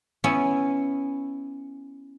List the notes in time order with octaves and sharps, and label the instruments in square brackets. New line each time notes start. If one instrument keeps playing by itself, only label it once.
[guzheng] B3 C#4 E4